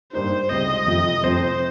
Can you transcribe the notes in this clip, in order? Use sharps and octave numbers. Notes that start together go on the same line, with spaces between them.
G2 G3 A#3 D#4 C5
C#2 C3 G3 D#5
F2 C3 F3
F2 C3 F3 C4 C5